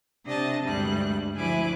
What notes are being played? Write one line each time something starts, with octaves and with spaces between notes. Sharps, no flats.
C3 D4 D#5 A5
D2 G2 G3 G#3 F#6
D2 F3 E4 G#5 D6 F#6